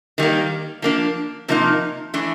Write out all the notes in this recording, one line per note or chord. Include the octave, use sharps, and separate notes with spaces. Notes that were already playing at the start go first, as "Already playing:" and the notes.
D#3 G3 A#3
F3 A#3 D4
C3 F3 A#3 D#4
E3 A3 D4